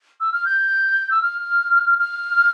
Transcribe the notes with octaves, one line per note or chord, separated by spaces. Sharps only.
E6
F6
G6
E6
F6
F6